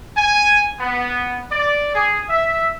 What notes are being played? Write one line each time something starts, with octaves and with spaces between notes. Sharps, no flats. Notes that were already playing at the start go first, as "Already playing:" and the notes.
G#5
B3
D5
G#4
E5